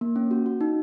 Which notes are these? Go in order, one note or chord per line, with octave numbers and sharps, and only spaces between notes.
A#3
C#4
F#4
F#4
D#4